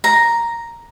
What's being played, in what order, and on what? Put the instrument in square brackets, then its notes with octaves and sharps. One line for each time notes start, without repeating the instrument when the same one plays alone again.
[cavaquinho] A#5